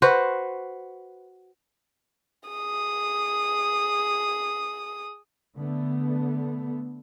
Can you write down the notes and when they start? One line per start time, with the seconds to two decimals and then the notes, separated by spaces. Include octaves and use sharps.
0.02 F#4 B4 C5
2.49 G#4 D#6
5.57 D3 A3 B3